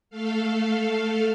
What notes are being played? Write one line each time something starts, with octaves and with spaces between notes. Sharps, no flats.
A3 A4 F5